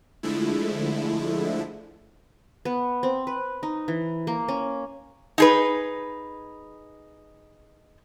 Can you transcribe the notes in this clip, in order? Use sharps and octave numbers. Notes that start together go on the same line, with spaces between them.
D3 F3 G#3 A3 E4
B3
C4
B4
D#4
E3
A#3
C#4
D#4 G#4 B4